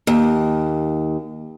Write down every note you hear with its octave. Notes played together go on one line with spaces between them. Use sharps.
D#2